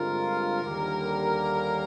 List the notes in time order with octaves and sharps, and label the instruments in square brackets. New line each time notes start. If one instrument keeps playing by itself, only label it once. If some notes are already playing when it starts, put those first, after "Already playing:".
Already playing: [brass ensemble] G2 D3 G#3 C4 F4 [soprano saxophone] A#4
[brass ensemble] D#2 D3 G3 A#3